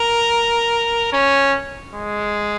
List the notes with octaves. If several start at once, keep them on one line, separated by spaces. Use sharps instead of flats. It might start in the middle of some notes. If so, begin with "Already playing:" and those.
Already playing: A#4
C#4
G#3